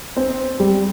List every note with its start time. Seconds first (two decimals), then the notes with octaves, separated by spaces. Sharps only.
0.16 C4
0.60 G3